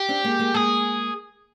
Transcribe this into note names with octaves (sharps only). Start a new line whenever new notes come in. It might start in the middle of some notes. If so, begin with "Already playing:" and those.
Already playing: G4
C4 D4
G#3 A#3
G#3 A#3
G#3 A#3 G#4